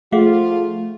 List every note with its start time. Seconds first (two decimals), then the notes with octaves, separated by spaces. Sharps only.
0.12 F3 A3 F4 G#4 F5 F#5